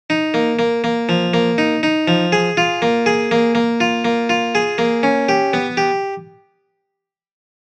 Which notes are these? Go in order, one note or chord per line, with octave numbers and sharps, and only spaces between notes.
D#4
A#3
A#3
A#3
F3
A#3
D#4
D#4
F3
G#4
F4
A#3
G#4
A#3
A#3
F4
A#3
F4
G#4
A#3
C#4
G4
B3
G4